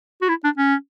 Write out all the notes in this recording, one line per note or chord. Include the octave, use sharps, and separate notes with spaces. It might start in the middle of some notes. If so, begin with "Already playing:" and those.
F#4
E4
D4
C#4